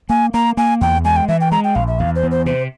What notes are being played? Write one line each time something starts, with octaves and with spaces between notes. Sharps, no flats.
A#3 G#5
A#3 A#5
A#3 G#5
E2 G5
G#3 G#5
G5
E3 E5
G5
G#3 A#5
G5
A#1 F5
E5
E2 F5
C5
E2
C5
C3 C5